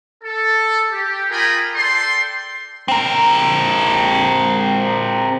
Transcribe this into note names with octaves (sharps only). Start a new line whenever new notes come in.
A4
G4
F4 G#4 A#4 G5 G#5 B5
A4 D5 G5 C6
C4 A#4